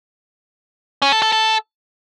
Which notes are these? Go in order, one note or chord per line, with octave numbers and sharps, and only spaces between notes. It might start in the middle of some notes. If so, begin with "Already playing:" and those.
C#4
A4
A4
A4